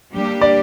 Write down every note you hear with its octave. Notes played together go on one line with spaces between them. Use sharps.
G3 A#3 D4 G4
D5